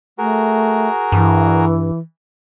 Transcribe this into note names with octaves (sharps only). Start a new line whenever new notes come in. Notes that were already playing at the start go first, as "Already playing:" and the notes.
A3 F#4 G#4 A#4
G2 E3